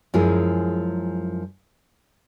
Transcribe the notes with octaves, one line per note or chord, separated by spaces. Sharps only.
F#2 F3 G#3 E4 G#4